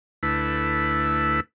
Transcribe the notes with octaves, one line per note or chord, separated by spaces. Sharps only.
D2 A3 E4 B4